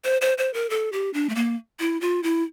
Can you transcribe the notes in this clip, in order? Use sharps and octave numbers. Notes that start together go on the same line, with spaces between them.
C5
C5
C5
A#4
A4
G4
D4
A3
A#3
E4
F4
E4